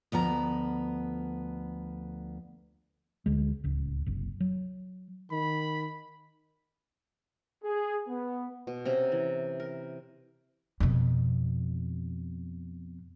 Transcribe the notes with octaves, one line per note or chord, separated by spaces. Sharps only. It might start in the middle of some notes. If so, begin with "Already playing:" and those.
D2 F3 B3 A#5
D2 G#3
D1 C#2
F#1 C2
F#3
D#3 B5
G#4
B3
B2
C3 C#4 A#5
E3
A#4
F2 B2